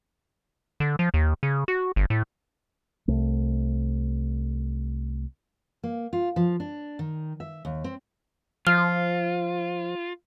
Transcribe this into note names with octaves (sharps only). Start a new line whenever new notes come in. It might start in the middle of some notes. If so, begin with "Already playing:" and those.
D3
F3
D#2
C#3
F#4
G1
A2
C2 A3
A#3
F4
F3
D4
D#3
E5
D#2
C4
F3 F4 F6